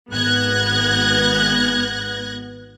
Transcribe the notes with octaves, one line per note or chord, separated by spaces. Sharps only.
G#1 B3 F#6 G#6 A#6